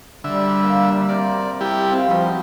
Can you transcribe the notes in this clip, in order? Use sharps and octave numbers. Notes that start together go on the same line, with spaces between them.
D3 G3 E5
A#3
C3 C4 A#4 D5
G3 E4 G4
C4 F4
F3 G3 D#4 F#4 B4